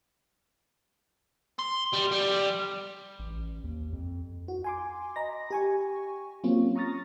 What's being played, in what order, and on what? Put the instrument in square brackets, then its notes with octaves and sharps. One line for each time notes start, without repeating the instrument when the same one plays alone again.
[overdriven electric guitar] C6
G3
G3
[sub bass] A1
D#2
F2
[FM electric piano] F#4
G#5 C6 D6
D#5 A#5 B5 A#6
G4 G#5 C#6
F#3 A#3 C4 C#4 F4
A#5 C#6 D#6 F6 A6 A#6